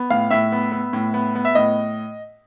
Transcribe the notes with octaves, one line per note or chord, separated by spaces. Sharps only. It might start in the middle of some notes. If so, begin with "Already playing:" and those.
Already playing: B3
A2 F5
A2 E5
B3
B3
A2
B3
B3
E5
A2 D#5